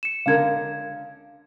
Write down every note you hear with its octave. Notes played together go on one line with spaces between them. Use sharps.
C#7 E7
C#2 D3 A#4 F5 G#6